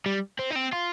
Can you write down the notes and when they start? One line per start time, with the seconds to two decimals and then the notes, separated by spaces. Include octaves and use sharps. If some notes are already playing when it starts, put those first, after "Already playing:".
0.06 G3
0.39 C4
0.51 D#4
0.56 C4
0.73 F4